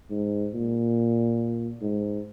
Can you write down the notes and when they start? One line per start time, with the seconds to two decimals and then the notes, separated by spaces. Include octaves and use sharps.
0.11 G#2
0.54 A#2
1.82 G#2